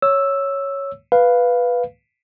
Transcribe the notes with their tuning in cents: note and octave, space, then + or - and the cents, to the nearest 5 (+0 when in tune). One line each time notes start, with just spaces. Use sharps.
C#5 +0 E6 +0
B4 +0 F5 +0